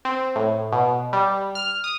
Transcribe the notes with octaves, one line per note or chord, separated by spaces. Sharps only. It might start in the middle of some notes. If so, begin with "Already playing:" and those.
C4
A2
B2
G3
F6
D#6